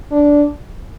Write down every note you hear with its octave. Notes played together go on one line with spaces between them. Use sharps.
D4